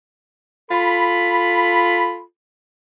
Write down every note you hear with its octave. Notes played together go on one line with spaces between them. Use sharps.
F4 A4 B5